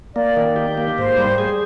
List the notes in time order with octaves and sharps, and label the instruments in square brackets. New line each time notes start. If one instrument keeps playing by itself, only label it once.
[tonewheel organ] A#3 [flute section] D5
[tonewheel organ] D#3
G4
A#3
[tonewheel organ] G#2 [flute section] C5
[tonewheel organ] G3
G#4